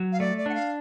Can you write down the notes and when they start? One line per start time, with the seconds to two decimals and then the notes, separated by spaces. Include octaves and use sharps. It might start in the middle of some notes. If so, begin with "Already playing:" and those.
Already playing: F#3
0.12 F5
0.20 A3 D5
0.38 D5
0.46 D4 F#5
0.54 F5